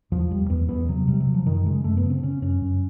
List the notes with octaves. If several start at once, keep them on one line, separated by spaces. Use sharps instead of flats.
E2 F3
E2 G3
E2 B3
E2 B3
C3 F#3
C3 G3
F#3
C3
F3
F#2 D#3
C#3 G#3
F#2 A3
B3
C#3
C4
C#3 C#4
F#2 C#4
F#2